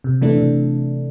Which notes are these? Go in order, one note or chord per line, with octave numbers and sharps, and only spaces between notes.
C3
E3 A3 D4
C3